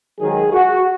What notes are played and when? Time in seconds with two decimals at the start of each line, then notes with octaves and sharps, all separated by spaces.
0.20 G#2 D#3 F#3 G#4
0.53 F#4